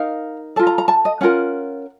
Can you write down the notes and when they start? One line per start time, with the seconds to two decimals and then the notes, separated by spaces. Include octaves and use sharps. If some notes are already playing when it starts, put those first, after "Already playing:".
Already playing: D#4 A#4 F5
0.56 F4 A4 A5
0.67 A#5
0.78 A#5
0.88 A5
1.05 D#5
1.21 C#4 F4 A#4 F#5